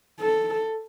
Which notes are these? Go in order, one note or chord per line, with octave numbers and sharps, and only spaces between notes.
A4